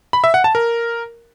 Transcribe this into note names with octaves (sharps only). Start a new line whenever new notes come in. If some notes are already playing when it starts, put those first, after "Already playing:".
B5
E5
F#5
A5
A#4